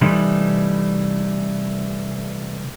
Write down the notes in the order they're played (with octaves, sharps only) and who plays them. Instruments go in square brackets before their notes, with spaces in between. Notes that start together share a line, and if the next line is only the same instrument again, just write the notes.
[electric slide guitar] C3 E3 G3 A3 D#4